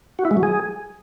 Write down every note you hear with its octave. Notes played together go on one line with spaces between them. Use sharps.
F#4
E4
G#3
F#3
G#4